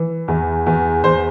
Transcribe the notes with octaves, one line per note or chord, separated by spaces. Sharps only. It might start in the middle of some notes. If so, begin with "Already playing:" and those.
Already playing: E3
E2
E2
E2 C5